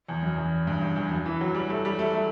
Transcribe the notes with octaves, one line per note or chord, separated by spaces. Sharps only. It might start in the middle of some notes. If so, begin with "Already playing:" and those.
E2
F#2
E2
G2
E2
E2
F#2
E3
F#3
G3
A3
G3
A3
A3